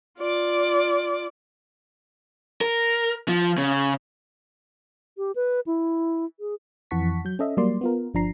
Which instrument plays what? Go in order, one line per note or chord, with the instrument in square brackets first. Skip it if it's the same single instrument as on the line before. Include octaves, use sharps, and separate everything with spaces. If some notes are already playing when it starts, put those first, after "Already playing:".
[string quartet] F4 D5 D6
[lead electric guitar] A#4
F3
C#3
[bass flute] G4
B4
E4
G#4
[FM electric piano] F2 E3 F#5 A5 C#6 B6
F#3 G6
C#4 A4 D#5 E5
F#3 G3 A#3 D5 C6
B3 F4 A#4
G1 F3 D4 A#5 C7